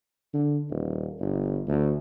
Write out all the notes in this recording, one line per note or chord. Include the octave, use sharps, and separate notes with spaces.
D3
D#1
G1
D2